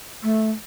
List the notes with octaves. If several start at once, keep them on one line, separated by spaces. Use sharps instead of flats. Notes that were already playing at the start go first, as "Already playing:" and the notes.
A3